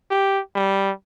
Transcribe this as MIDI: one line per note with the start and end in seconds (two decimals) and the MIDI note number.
0.11 0.41 67
0.55 0.91 55